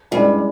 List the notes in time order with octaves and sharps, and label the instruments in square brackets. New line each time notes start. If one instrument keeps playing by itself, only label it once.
[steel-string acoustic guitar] G2 [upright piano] G#3 C#4 E4